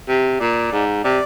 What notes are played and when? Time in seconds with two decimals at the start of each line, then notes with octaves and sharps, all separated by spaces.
0.08 C3
0.40 A#2 D5
0.72 G#2
1.04 C3 D5